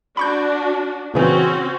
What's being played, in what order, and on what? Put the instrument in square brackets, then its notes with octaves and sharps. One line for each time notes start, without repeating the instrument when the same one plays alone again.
[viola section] D4 F#4 [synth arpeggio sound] B5 C#6 G6
[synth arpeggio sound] A#2 C#3 E3 [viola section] C4 C#4 F#4